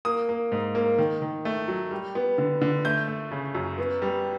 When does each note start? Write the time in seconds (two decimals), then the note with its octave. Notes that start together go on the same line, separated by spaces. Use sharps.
0.05 A#3 D#6
0.29 A#3
0.52 G#2
0.75 A#3
0.98 D#3
1.22 D#3
1.45 A3
1.68 F#3
1.91 G3
2.15 B3
2.38 D3
2.61 D3
2.85 A3 G6
3.08 A3
3.31 C#3
3.55 F#2
3.78 B3
4.02 G3